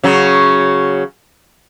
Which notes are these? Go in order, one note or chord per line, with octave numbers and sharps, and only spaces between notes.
C#3 F#3